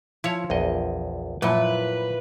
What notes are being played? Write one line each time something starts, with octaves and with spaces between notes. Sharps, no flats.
F3 E4 C#5
A#1 E2 D#5
F#2 A#2 F3 E4 B4 B5